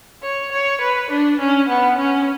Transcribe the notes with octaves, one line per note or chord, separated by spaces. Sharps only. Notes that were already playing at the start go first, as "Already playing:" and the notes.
C#5
C#5
B4
D4
C#4
B3
C#4